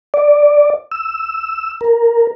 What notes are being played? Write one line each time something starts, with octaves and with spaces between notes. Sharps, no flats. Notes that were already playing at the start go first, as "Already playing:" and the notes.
D5
E6
A#4